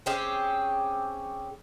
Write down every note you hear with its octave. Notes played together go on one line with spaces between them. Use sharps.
C4 C#4 G4 G#4